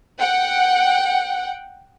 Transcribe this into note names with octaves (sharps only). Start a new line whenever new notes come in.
F#5 G5